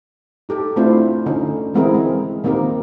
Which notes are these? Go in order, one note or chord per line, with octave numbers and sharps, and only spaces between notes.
D#4 G4 A4
A3 C4 D4 E4 F4 C5
D3 C#4 D#4
E3 G#3 C4 E4 G#4 A#4
G#3 C4
D#3 A#3 C4 D#4 G4 A#4